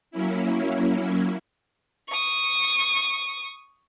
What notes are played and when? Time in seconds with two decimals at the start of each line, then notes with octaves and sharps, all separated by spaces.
0.11 F#3 A#3 C#4 E4
2.09 C#6 D#6